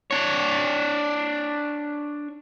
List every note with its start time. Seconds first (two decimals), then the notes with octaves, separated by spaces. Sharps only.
0.11 D4 C#5